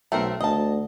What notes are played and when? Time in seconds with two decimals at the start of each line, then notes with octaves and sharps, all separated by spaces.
0.12 B1 A3 C4 A#4
0.41 D2 D#5 A5